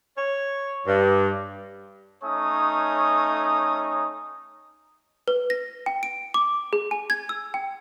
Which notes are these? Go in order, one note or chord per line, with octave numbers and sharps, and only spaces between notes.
C#5
G2
A3 C#4 D#4 C#5 C#6 D#6
B4
A#6
G5
D7
D6
G#4
G#5
G#6
E6
G5